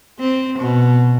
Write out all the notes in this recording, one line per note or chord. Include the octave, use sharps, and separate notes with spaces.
C4
B2